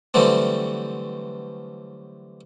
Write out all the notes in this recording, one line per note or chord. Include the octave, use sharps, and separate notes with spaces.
D3 E3 F#3 G3 A3 C4